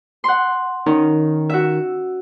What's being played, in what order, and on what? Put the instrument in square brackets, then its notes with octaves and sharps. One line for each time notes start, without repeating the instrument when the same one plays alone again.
[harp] F#5 C6
[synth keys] D#3 [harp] C#4
[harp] F#4 E5